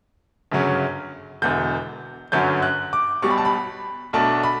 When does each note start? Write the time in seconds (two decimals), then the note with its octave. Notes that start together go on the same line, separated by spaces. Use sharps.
0.52 G1 F#2 C#3 F#3 C#4
1.42 E1 E2 D3 G6
2.32 G1 F#2 D3 F#3 C#4 G6
2.62 F#6
2.93 D6
3.22 B1 B2 G3 C#6
3.30 B5
3.38 A5
3.45 B5
4.13 B1 B2 A3 D4 A5
4.43 B5